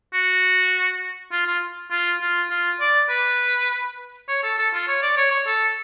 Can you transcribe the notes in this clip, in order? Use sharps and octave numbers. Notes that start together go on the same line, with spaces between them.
F#4
F4
F4
F4
F4
F4
D5
B4
C#5
A4
A4
F4
C#5
D5
C#5
C#5
A4